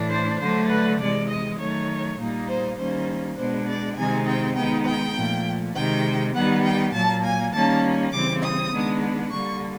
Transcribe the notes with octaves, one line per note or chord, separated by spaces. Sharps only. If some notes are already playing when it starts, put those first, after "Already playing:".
Already playing: A2 E3 A3 D4
C5
D3 F#3 A3 D4 C5
B4
C3 E3 G#3 D5
D#5
D#3 F#3 A3 C#5
A#2 G3 A#3 D#4
C5
D#3 G3 A#3 C#4 C5
B2 G#3 B3 D4 C5
D5
C3 D#3 G#3 C4 D#4 G#5
G5
D#3 G#3 B3 D#4 G5
G5
A#2 F3 A3
C3 D#3 G#3 G5
D#3 G3 B3 F#5
G5
A#2 F#3 A#3 A5
G#5
D#3 G3 A#3 C#4 A5
C#3 E3 G3 C4 D6
D#6
D#3 G#3 B3 D4
D3 G3 A#3 C#6